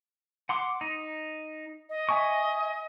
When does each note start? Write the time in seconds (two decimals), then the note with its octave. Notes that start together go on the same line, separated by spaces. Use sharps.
0.49 F#5 C6 D6
0.81 D#4
1.89 D#5
2.09 E5 G#5 C#6